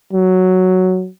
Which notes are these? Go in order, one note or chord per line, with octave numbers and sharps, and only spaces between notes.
F#3